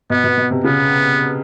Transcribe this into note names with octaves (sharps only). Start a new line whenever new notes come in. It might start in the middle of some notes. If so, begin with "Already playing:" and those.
B2 B3
B2
B2
C3
C#3 B3